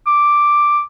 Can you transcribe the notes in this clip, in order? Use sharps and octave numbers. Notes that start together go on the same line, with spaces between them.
D6